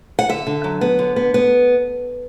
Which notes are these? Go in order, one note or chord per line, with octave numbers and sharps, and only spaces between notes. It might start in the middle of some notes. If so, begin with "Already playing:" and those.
F#5
D3 E5
D3
F#3
B3
D3
B3
B3